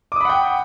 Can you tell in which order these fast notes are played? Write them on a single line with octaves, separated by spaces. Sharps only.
D6 D#6 B5 F#5 G5